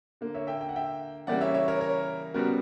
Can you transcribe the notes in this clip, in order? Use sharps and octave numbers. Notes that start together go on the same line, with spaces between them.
D3 A#3
C#5 E5
E5 G5
G5
F#5
E5 G5
C#3 E3 G3 A#3 D5 F#5
C#5 E5
C#5 E5
A#4 C#5
A#4 C#5
C#3 G3 B3 F#4 A#4